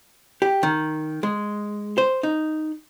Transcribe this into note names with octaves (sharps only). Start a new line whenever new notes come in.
G4
D#3
G#3
C5
D#4